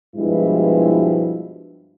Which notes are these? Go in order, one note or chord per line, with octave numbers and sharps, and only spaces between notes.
G2 B2 F3 G#3 E4